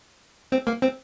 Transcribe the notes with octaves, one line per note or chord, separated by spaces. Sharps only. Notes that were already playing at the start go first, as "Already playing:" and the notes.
C4
A#3
C4